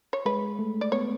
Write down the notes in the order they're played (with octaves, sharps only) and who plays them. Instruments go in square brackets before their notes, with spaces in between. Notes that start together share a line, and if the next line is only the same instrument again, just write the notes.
[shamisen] C#5
[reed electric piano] G#3 [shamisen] B4
[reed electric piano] A3
[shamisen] D5
[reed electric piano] B3 [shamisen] C#5